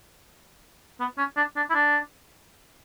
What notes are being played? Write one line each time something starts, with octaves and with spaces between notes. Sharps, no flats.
B3
C#4
D4
D4
E4
D4